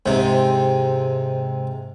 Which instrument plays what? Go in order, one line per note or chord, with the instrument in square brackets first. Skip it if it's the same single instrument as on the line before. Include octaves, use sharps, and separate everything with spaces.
[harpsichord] G#2 C3